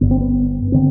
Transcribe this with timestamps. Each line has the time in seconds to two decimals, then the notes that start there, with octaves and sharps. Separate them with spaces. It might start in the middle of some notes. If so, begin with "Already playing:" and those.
0.01 G1 G2 D3 B3
0.11 C4
0.21 B3
0.72 D3 C4